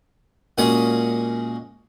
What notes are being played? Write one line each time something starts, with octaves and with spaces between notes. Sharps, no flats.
A#2 G#3 C#4 F#4 G#4 D#6